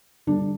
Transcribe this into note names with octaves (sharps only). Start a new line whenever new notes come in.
D3 G3 D4